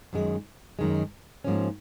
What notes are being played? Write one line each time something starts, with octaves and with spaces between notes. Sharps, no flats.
F#2 D#3 G#3
F#2 D#3 G#3
G#2 F3 A#3 C#4